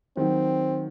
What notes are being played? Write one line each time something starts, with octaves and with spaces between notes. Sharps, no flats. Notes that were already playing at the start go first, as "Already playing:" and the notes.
D#3 F#3 C4